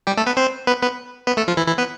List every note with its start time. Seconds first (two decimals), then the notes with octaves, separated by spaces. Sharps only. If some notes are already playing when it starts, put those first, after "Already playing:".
0.07 G3 G4
0.17 A3 A4
0.27 B3 B4
0.37 C4 C5
0.67 B3 B4
0.82 B3 B4
1.27 B3 B4
1.37 A3 A4
1.48 F3 F4
1.57 E3 E4
1.67 E3 E4
1.78 B3 B4